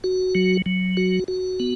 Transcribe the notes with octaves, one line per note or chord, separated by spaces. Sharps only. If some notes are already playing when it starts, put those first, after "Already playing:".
F#4
F#3
F#3
F#4
F#4
B3